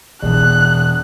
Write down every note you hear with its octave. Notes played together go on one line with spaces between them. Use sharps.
E1 F#6